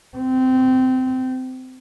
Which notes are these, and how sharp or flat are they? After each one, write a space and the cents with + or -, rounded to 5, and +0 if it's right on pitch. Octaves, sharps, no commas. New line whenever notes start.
C4 -20